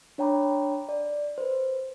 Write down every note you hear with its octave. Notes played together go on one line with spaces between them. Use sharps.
D4 C#5 G5 A#5 B5 D6
D5
B4 C5